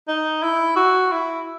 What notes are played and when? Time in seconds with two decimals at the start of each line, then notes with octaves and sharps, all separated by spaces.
0.08 D#4
0.43 E4
0.76 F#4
1.12 E4